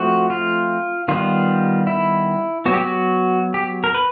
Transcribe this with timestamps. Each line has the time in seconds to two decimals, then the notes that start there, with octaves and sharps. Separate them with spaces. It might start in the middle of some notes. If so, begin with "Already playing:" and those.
Already playing: F3 A3 C4 F#4
0.30 F4
1.08 D#3 G3 B3 F4
1.87 E4
2.66 F#3 B3 F#4
2.74 G4
2.81 F#4
3.54 G4
3.84 A#4
3.94 B4